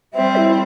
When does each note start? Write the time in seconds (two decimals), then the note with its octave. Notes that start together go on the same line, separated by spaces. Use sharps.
0.14 G3 C4 E5
0.36 E4